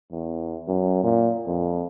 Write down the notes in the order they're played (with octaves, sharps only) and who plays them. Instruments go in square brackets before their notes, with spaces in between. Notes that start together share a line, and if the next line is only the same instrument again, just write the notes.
[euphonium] E2
F#2
A#2
F2